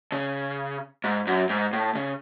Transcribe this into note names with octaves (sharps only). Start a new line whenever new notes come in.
C#3
G#2
F#2
G#2
A2
C#3